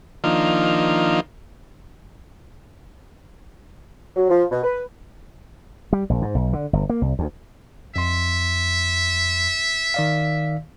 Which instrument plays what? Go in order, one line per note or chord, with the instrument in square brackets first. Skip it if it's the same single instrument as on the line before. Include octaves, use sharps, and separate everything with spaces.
[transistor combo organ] D#3 F3 A#3 D4 D#4 F4
[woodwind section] F#3
F3
B2
B4
[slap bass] G3
A#1
G#2
B1
D3
G1
A#3
C2
D2
[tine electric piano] F2 C6 [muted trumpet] E5
[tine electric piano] D#3 D5 F5